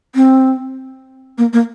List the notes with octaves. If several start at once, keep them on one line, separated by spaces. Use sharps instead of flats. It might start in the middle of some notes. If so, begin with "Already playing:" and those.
C4
A#3
A#3